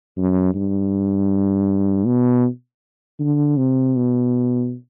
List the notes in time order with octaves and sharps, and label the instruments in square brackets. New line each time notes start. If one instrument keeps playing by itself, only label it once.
[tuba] F#2
G2
B2
D3
C3
B2